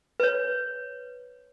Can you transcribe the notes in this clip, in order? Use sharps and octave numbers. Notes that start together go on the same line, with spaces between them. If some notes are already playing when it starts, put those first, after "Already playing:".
B4 C#5